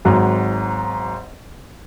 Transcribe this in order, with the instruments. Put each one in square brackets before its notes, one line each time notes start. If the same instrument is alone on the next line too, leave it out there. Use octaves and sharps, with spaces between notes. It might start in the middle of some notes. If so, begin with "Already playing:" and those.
[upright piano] G#1 G#2 F#3